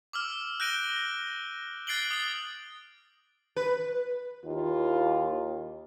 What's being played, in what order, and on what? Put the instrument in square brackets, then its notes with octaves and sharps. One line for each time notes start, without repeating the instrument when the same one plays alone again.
[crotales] D6 E6 F6
F#6 G6 A#6 D7 D#7 G7
F#6 A6 C7 D7 F#7 G7
D#6 A6 C7
[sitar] B4
[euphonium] D#2 [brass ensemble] A#3 E4 F4